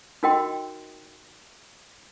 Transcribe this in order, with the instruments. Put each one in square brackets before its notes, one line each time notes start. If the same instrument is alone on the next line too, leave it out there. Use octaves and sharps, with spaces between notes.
[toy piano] D#4 F#4 A#4 D#5 G5 C6